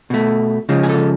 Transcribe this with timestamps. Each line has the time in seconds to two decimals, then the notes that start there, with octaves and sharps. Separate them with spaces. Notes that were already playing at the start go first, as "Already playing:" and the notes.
0.10 B2 A3
0.69 C#3 F3 G#3
0.83 G#4
0.89 A4